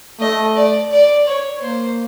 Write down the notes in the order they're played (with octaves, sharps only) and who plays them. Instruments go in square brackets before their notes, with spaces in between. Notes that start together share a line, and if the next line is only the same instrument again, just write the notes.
[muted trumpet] A3 [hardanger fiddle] D#5
[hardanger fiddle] D5
D5
C#5
[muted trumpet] A#3 [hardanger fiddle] C5